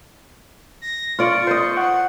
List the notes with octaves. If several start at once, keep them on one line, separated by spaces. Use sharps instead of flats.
A#6
F4 D5 C#6
C5 D#5
F#5